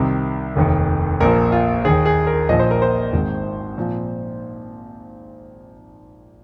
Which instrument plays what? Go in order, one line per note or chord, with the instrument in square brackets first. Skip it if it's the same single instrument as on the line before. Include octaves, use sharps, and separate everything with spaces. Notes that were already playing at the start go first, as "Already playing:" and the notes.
Already playing: [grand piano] C2 C3 D#3
F1 D#2 D#3
A#1 A#2 F3 A#4
F4
D#2 D#3 G#4
G#4
A#4
A#1 A#2 F3 D#5
C5
A#4
C5
G#1 G#2 D#3
A#2 F3